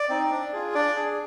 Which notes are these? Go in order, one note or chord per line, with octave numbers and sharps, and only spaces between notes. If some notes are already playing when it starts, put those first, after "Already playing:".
Already playing: D5
C4 D#4
D4
F4 G#4
D4 D5
G#4